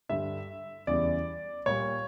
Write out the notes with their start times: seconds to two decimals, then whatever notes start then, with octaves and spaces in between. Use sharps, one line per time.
0.09 G2 D3 G3 E5
0.87 E2 C#3 E3 G3 D5
1.66 A#2 G3 C#5